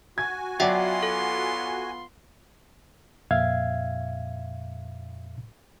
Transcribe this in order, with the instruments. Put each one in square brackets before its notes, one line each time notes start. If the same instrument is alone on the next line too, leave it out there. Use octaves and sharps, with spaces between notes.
[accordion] F#4 G#5 [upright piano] G#6
[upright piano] F#3 D5 [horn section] B3 F4 C6 [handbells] E5 F#5 G5
[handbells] A4
[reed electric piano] F2 A#2 E5 F5 G#6